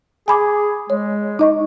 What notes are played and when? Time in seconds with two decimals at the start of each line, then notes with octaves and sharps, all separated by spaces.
0.28 G#4 G#5 B5 D6
0.90 G#3 C#5
1.39 D#4 D#5 C#6